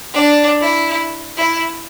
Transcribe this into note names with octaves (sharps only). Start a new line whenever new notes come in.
D4
E4
E4